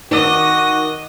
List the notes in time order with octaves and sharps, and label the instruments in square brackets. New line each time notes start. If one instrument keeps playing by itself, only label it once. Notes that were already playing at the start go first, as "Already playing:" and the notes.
[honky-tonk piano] D#3 D6 [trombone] F#4 [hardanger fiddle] D#5